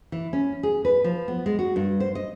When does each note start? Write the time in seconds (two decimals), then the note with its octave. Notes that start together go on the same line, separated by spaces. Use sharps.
0.12 E3
0.33 C#4
0.63 G#4
0.85 B4
1.04 F3
1.28 B3
1.46 G#3
1.59 F#4
1.76 G2
2.00 C5
2.15 D#5